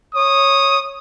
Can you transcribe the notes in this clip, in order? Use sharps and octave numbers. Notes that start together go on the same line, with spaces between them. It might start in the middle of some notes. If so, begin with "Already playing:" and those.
C#5 D#6